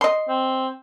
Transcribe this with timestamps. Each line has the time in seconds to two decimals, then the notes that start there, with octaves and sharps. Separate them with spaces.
0.01 D#5 C6
0.28 C4